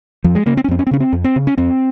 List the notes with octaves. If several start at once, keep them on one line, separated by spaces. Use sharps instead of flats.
F2 F3
G#3
C#3 A#3
C4
C#4
F2 C4
C#4
C4
C#3 C#4
C4
F2
C4
C#3
C#4
F2 C4